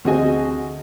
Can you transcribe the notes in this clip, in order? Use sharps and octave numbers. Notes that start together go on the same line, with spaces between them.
D2 C4 F#4 G#4 D#5 G#5